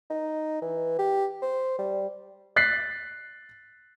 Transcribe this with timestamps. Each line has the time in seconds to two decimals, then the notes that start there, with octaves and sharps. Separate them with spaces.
0.10 D#4
0.62 E3
0.99 G4
1.42 C5
1.78 G3
2.56 F#6 A6 B6 C7